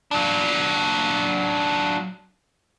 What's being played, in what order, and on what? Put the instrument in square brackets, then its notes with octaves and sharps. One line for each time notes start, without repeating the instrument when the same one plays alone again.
[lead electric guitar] F#3 D4